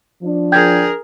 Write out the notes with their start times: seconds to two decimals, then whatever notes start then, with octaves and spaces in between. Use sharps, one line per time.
0.22 F3 D4
0.52 G#4 A#4 G5 G6 G#6